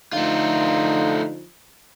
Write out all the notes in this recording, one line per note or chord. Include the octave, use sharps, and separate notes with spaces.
D3 F3 A3 D#4 F4